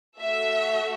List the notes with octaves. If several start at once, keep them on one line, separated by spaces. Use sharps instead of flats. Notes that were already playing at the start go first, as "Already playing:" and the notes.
A3 F#4 A4 E5